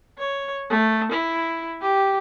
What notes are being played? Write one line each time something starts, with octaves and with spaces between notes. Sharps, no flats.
C#5
A3
E4
G4